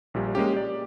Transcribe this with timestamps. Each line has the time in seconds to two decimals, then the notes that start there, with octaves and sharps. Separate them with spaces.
0.14 A#1 A#2 G3
0.35 G#3 A#3 C#4 G4
0.54 G4 D5